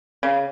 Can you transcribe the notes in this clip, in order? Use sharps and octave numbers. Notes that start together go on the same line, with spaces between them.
C#3